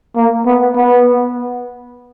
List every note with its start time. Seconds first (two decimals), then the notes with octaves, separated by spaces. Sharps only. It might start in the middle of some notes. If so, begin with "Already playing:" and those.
0.16 A#3
0.46 B3
0.76 B3